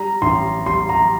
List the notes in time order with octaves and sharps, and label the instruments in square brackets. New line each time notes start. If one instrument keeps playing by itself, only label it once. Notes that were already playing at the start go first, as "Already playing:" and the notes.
Already playing: [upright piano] G3 [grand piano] A#5
[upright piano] A1 [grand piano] C6
[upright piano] G3 [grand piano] C6
[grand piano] A#5